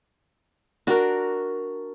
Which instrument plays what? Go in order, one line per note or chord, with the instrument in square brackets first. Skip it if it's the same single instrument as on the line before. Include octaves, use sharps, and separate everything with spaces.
[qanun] D4 F#4 [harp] A#4 A#5